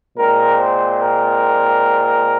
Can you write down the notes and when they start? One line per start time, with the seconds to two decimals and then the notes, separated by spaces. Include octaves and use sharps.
0.16 A#2 G#3 C4 A#4
0.57 C5
0.99 A#4